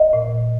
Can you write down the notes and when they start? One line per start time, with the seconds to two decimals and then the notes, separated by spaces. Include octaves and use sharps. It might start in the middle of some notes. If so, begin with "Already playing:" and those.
Already playing: D#5
0.13 A#2